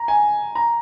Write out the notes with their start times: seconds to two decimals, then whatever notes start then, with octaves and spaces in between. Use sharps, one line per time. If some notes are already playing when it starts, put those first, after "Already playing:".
Already playing: A#5
0.08 G#5
0.55 A#5